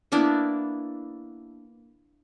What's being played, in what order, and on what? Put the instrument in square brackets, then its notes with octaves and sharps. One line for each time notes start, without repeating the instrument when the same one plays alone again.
[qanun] A#3 B3 D4 E4